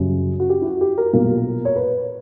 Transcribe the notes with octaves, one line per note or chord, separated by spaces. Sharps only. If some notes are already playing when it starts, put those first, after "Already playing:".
Already playing: F#1 F#2 C#3 G3
F#4
G4
E4
F#4
G4
A#4
B1 A#2 A#3 A#4
C#5
B4